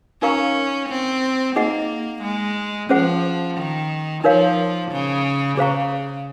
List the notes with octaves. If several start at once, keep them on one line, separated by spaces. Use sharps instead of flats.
C#4 D#4 A#4 F5 A#5 C#6
C4
A#3 D#4 G#4 D#5 F#5
G#3
F3 C#4 G#4 C5 F#5
D#3
F3 D#4 A#4 C#5 F5
C#3
C#3 G#4 C5 F5 A#5 C#6